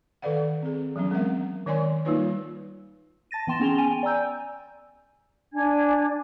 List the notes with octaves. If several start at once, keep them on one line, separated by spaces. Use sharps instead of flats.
D#3 A4 B4 D5 F5 F#5
C4 G#4
E3 F#3 B3 C#4
G#3 C4 A#4 E5 F#5
D#3 A#4 C#5 D5 G#5 C6
G3 A#3 D#4 F4 B4 C#5
A5 A6 A#6 D#7
E3 B3 G5 C6 E7
B3 C#4 G#4 F7 G7
G5 G#5 D#7
D5 G#5 A#5 E6 G6
D4 G#5 G#6